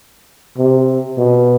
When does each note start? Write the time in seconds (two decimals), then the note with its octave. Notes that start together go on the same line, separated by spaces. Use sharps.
0.57 C3
1.18 B2